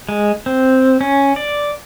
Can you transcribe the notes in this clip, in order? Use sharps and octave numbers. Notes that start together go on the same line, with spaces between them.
G#3
C4
C#4
D5